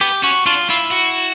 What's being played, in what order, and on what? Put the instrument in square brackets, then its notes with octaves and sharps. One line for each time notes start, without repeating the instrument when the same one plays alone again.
[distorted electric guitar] B3 [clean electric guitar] G4
[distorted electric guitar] C#4 [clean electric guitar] F#4
[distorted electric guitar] D4 [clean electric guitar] F4
[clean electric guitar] E4 [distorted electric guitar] F4
[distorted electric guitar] F#4